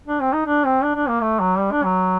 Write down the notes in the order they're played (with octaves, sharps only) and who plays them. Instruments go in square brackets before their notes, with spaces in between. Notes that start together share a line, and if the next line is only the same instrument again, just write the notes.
[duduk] D4
C4
D#4
D4
C4
D4
D4
A#3
A3
F#3
G3
D4
F#3